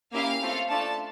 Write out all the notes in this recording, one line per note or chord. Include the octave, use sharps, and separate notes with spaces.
A#3 C#4 E4 G4 F5
A3 C4 F4 A4
A3 D4 F4 A4 A5